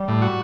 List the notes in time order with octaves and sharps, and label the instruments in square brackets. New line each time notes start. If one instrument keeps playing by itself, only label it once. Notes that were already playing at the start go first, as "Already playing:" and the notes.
Already playing: [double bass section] G3
[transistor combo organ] A2
F#4